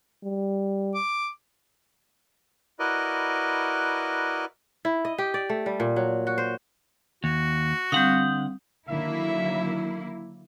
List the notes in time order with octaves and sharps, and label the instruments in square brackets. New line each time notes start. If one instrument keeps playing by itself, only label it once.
[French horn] G3
[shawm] D6
[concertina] E4 F#4 A#4 B4 D5 D#5
[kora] E4
D#5
G4
D5
A3
G3
A#2
F#3
F#4
C5
[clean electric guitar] D#2 [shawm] F#4
[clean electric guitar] D3 F#5 [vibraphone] G3 C4 F5 [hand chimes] D#6 G6
[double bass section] D3 D#3 F#3 [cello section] A#3 E4 [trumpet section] E5